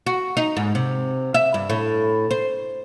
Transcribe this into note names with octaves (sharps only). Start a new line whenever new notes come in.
F#4
D#4
G#2
C3
E5
G2
A2
C5